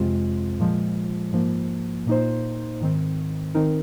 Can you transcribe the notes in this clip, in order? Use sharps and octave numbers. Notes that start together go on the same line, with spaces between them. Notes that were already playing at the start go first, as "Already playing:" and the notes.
Already playing: F2 C3 G#3 C4 F4
A#2 F3 G#3
G#2 F3 A#3
A#2 A#3 D#4 C5
G#2 D#3 C4
D#3 C4 D#4 A#4